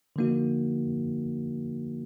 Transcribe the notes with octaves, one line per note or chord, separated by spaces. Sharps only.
D3 F3 A#3 D#4 F#4